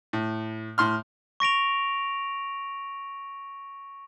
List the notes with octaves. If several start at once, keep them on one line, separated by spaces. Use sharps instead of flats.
A2
A2 C6 F6
C#6 A#6 D7 F7